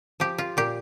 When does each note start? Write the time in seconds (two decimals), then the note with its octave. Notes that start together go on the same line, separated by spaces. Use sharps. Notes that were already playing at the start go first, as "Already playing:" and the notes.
0.20 F3 G4
0.38 F4
0.57 A#2 G4